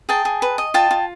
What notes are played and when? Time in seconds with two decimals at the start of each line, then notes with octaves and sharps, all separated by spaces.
0.09 G#4 G5 A5
0.25 G#4
0.42 B4
0.58 D#5
0.74 F4 G5 A5
0.91 F4